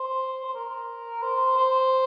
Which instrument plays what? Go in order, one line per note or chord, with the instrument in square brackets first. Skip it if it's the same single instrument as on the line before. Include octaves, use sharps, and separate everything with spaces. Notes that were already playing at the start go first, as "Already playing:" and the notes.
Already playing: [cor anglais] C5
C5
A#4
C5
C5